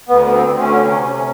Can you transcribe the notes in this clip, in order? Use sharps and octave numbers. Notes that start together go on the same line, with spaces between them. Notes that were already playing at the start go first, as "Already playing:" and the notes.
D2 B3
B3
C4
D2
C#4
C3